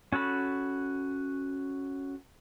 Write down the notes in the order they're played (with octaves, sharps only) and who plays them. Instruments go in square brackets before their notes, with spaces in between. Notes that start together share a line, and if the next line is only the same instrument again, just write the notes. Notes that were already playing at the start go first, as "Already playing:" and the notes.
[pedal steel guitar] C#4 F#4 A4 B5